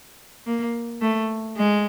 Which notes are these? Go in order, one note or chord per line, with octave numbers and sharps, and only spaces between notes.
A#3
A3
G#3